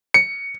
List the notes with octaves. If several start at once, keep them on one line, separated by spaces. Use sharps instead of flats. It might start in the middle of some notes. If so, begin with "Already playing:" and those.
C#7